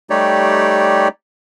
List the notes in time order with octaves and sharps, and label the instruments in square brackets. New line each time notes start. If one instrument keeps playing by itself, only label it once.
[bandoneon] G3 A3 D#4 G4 C#5 D5